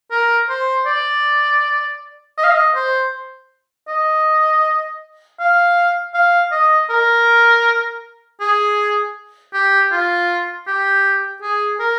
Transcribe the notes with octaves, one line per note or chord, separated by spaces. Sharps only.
A#4
C5
D5
D#5
F5
D#5
C5
D#5
F5
F5
D#5
A#4
G#4
G4
F4
G4
G#4
A#4